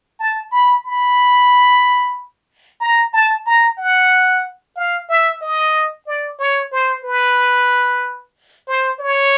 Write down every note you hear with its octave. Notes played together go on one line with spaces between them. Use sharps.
A5
B5
B5
A#5
A5
A#5
F#5
F5
E5
D#5
D5
C#5
C5
B4
C5
C#5